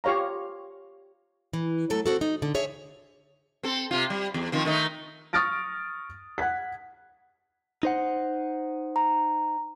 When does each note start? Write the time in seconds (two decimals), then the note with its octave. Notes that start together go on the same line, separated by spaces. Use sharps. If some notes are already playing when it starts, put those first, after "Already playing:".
0.04 F4 G4 C#5 F5 A#5
1.53 E3
1.90 F#3 A3 A4
2.06 C4 F#4 A4
2.21 D#4
2.42 D3
2.55 G#4 C#5 E5
3.63 C4 A4
3.91 C3 F4
4.10 G3
4.34 E2
4.52 D#3 F3 C4
4.65 D#3 A3 D#4
5.33 C#6 D#6 F6 A6 A#6 D7
6.38 F#5 F#6 G#6 B6
7.83 D#4 C5 F#5
8.96 A#5